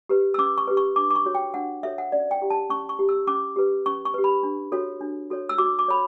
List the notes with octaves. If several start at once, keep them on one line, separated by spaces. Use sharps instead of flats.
G4 B4
E6
C#4 D6
C#6
G4 B4
C#6
D4 D6
D6
C#6
F#4 A4 C#5
G5
D4 F#5
F#4 A4 C#5 E5
F#5
C#4 D5
G5
E4 G4
A5
C#4 C#6
C#6
E4 G4
E6
C#4 D6
G4 B4
C#4 C#6
C#6
G4 B4
B5
D4
F#4 A4 C#5
D4
F#4 A4 C#5
E6
F#4 D6
D6
A4 C#5 B5